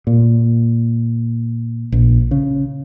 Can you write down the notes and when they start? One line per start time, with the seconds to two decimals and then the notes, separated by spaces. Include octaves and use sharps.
0.07 A#2
1.92 A#1
2.31 C#3